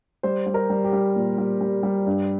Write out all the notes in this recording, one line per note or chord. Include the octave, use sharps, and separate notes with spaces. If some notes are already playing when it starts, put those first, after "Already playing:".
G3 C5
G3
A#4
G3
G4
G3
A#2
G3
G3
G3
G2